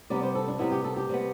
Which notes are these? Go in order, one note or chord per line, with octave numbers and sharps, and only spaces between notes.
C3 G3 B3 D5
C5
A4
D4
C3 G3 B3 E4
G4
A4
G4
C3 G3 B3